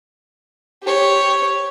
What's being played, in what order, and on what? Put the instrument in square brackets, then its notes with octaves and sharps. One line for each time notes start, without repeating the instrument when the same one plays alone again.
[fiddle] G4 C#5